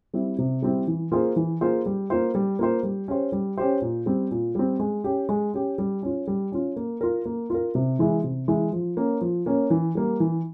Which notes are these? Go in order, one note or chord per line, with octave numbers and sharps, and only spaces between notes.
G3 C4 E4
C3
G3 C4 E4
E3
A#3 F4 G#4 C5
E3
A#3 F4 G#4 C5
G3
A#3 F4 C5
G3
A#3 F4 C5
G3
C#4 G4 C5
G3
C#4 G4 C5
A#2
G3 C4
A#2
G3 C4
G#3
C#4 G4
G#3
C#4 G4
G3
C#4 F4
G3
C#4 F4
A#3
F4 A#4
A#3
F4 A#4
C3
E3 G#3 E4
C3
E3 G#3 E4
F3
A#3 C#4
F3
A#3 C#4
E3
G3 A#3
E3